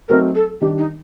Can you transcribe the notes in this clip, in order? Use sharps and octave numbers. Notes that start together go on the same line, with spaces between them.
F#3 A3 C4 D#4 A#4
A4
D#3 G3 D4 G4
D#4